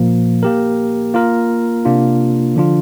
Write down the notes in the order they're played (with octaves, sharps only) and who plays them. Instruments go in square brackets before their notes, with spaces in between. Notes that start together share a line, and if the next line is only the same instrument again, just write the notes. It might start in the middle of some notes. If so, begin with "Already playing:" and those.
Already playing: [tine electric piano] A#2 F3 A#3
A#3 G4 A#4
A#3 F4 A#4
C3 A#3 D4 F4
D3 F3 D4 F4